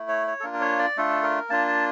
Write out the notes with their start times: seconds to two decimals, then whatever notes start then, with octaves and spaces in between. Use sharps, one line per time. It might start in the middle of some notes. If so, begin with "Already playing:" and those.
Already playing: A3 E4
0.08 C#5
0.27 C#5
0.40 A4
0.43 A#3 D4 F4 A#4
0.54 A#4
0.61 C#5
0.79 D5
0.97 A3 D4 F4 A4
1.23 A#4
1.49 A#3 D4 F4 A5
1.67 A5